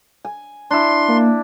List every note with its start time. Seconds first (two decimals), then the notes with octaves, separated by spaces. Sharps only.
0.25 G#5
0.71 D4 E4 C6
1.08 A#3